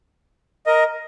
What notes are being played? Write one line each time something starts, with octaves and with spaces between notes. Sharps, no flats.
A#4 D#5